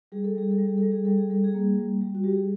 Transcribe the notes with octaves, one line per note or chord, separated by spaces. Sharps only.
G3 G#4
A4
G3 G#4
A4
G3
G#4
G3 A4
G#4
G3 A4
G#4
G3 A4
G#4
A#3
G3
G3
F#4
G3 G4
G#4